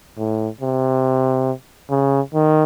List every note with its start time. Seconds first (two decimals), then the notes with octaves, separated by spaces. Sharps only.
0.18 A2
0.61 C3
1.90 C#3
2.34 D#3